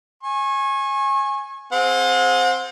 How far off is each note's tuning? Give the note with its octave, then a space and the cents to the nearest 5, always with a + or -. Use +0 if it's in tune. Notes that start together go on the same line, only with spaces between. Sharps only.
G#5 +0 C#6 -30
C4 +0 G#4 +0 F#5 -45